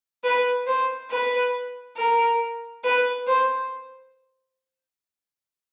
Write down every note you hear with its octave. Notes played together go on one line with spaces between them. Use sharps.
B4
C5
B4
A#4
B4
C5